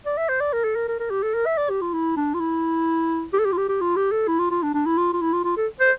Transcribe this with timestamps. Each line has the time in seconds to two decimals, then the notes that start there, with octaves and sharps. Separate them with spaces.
0.06 D5
0.18 E5
0.29 C5
0.41 D5
0.53 A#4
0.64 A4
0.76 A#4
0.88 A#4
1.00 A#4
1.11 G4
1.23 A4
1.34 A#4
1.46 E5
1.58 D5
1.70 G4
1.81 F4
1.93 E4
2.17 D4
2.34 F4
2.40 E4
3.33 G4
3.39 A4
3.45 G4
3.52 F4
3.58 G4
3.69 G4
3.81 F4
3.96 G4
4.12 A4
4.28 E4
4.39 F4
4.51 F4
4.63 D4
4.74 D4
4.86 E4
4.98 F4
5.13 F4
5.21 E4
5.33 F4
5.44 F4
5.57 A4
5.80 C5